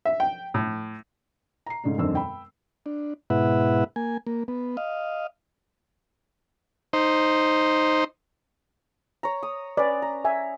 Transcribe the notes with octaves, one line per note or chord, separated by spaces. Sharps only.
E5
G5
A2
A#5 C7
G#2 C#3 A3 D4
E1 F#2 D3 D#3 C4 E6
G5 B5
D4
G#2 B2 E4 B4 E5 F#5
A#3 G#5
A#3
B3
D#5 F5
D#4 C5
C#5 A#5
D#6
C#4 B4 D5
A#5
E5 G#5